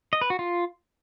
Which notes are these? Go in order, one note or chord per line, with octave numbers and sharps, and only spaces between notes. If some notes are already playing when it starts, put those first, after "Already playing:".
D#5
B4
F#4
F4